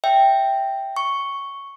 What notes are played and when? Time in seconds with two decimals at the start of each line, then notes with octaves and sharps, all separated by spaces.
0.04 E5 G5
0.97 C#6